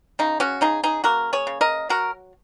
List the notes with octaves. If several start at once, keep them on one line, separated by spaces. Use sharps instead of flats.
C#3 D#4
C#4 F#4
C#3 D#4 G#4
D#4 G#4
A#3 F#4 A#4
G#4 C#5
C#3
A#4 D#5
F#3 F#4 A#4